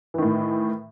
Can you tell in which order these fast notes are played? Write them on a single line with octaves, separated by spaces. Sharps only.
E3 D#3 A2